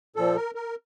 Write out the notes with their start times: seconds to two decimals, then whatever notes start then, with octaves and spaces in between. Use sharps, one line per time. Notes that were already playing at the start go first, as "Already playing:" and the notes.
0.16 A#2 F3 A4
0.36 A#4
0.55 A#4